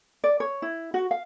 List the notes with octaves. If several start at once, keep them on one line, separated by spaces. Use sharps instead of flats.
D5
C#5
E4
F#4
F5